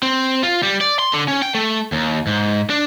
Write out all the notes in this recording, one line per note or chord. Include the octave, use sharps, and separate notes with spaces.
C4
F4
G3
D5
C6
D3
C#4
G5
A3
D#2
G#2
D4